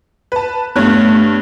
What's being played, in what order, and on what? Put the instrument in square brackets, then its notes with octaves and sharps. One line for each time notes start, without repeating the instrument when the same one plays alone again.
[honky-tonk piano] B4 A5
[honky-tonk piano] G2 C#5 F#6 [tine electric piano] A3 B3